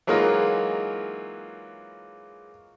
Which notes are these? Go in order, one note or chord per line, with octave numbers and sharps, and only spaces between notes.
E3 F#3 G#3 A#3 D#4 F4